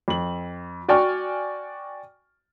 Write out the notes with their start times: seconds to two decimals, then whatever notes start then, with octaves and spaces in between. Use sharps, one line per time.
0.08 F2 F#7
0.88 F#4 D5 G5 G#5 C#6 F6